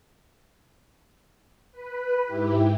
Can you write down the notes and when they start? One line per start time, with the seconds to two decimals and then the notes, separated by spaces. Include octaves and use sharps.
1.72 B4
2.25 G#2 E4 G4